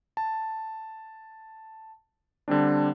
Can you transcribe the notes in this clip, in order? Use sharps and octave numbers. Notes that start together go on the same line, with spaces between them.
A5
D3 G3 C4 D4